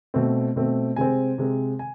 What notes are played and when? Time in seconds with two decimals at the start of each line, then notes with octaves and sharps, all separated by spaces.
0.14 B2 A3 C4
0.56 B2 A3 C4
0.96 C3 G#3 C4 G#5
1.38 C3 G#3 C4
1.79 G#5